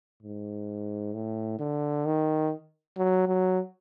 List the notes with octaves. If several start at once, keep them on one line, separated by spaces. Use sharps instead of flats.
G#2
A2
D3
D#3
F#3
F#3